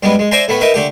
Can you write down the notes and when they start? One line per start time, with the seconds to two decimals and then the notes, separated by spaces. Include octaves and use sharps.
0.03 G2 G3 G#3 B3
0.19 G#3
0.31 C5 D5 E5 G#5 A#5 C6
0.48 A2 A3 B3 B5
0.61 D#4 A#4 B4 E5
0.74 D3 A3 G4